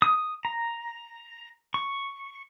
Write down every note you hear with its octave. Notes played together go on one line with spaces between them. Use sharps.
D#6
A#5
C#6